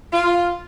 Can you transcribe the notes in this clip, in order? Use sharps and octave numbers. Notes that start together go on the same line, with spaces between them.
F4